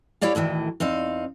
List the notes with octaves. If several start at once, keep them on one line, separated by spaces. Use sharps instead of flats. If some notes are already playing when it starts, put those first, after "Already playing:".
E4 G4 C#5 D5 F5
D2 A2 D#3 E3
E2 C4 D#4 F5